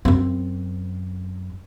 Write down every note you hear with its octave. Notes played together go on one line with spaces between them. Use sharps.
F#2 C4